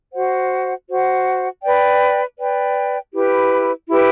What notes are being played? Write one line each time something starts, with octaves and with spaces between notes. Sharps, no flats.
F#4 C5 F#5
F#4 C5 F#5
B4 D5 G5
B4 D5 G5
E4 G4 B4
E4 G4 B4